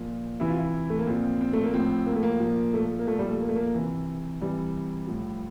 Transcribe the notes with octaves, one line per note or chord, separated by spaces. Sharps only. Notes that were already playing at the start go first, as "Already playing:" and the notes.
Already playing: A#2 F3 F4
C3 E3 E4
F4
E4
A3
A#3
A#2 F3 C4
C4
C4
A3
A#3
A2 F3 C4
A#3
A3
A#3
A#2 F3
A3
A#3
A#2 F3 A3
G3
A3
A#3
A3
A#3
C3 E3
C3 E3 G3
A2 F3